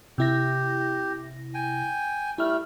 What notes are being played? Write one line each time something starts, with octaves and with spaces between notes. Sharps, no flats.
C3 E4 G4 A#6
G5 G#5
G3 A3 E4 F6